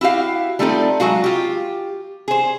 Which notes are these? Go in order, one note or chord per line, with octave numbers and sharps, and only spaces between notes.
E4 F#4 G4 F5
G3 A3 C4 D#4 F4 A4
F#3 G#3 F#4 F5
F4 G4
G#4 C5